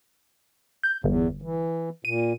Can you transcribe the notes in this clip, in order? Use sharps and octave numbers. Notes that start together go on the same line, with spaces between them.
G6
G1 E2
E3
A#2 D#7